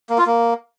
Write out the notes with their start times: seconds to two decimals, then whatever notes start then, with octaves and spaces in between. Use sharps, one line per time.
0.10 A#3
0.18 F4
0.26 A#3